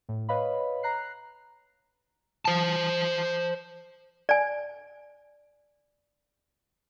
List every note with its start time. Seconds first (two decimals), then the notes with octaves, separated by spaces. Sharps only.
0.09 A2
0.29 B4 C#5 D#5 F5 B5
0.83 A#5 F#6 C7
2.45 C5 A5
4.29 D5 G#5